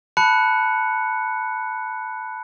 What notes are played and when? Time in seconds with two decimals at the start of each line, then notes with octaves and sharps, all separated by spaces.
0.17 A5 B5 F#6 C#7